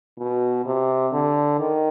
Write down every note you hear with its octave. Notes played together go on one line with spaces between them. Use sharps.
B2
C3
D3
D#3